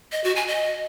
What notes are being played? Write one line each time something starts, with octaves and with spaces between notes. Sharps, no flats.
D#5
F#4
G#5
D#5